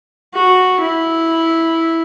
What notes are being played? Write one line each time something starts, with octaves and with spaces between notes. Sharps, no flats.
F#4
E4